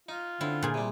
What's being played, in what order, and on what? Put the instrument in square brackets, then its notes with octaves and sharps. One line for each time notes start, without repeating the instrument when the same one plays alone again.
[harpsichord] D#4 [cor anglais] F4
[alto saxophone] D3 [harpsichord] C4 [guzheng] E4
[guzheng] A#2 G#4
[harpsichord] C3 G3